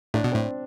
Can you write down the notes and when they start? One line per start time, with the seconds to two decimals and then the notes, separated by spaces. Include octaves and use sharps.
0.14 A2 D4
0.24 B2
0.32 A2 C4